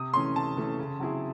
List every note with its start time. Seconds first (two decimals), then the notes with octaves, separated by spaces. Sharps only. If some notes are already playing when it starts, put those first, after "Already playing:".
Already playing: C3 D#6
0.14 E3 A3 C#4 C6
0.36 C3 A5
0.57 E3 A3 C#4
0.79 C#3
1.00 F#3 C4 E4 G#4